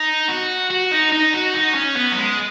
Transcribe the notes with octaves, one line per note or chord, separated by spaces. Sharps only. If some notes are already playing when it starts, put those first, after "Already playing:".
Already playing: D#4
F#4
F#4
D#4
D#4
F#4
D#4
C#4
B3
F#3
G#3